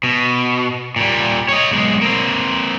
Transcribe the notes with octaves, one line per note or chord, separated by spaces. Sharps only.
B2
A#2 G3
C#5 D#5
B1 G#3
A#3 C4